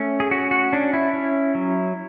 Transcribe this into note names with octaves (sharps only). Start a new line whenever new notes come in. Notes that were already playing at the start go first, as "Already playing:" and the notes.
Already playing: A3 C#4
G#4
C#4 F#4
F#4
C#4 D4
E4
C#4
F#3